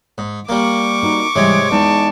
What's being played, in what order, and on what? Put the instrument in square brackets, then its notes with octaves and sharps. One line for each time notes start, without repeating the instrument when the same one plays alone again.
[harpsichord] G#2
[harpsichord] G3 A#3 [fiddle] C#6 D6
[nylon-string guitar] D#4 F#4 A#4
[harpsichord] G#2 C3 G#3 [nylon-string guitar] E3 G3 [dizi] C#5
[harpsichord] E2 [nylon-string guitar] G#3 D#4 [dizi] A5